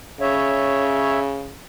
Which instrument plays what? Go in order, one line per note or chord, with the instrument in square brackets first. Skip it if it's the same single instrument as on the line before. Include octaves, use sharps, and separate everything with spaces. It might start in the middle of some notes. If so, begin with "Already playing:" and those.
[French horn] C#3 [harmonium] C#5 E5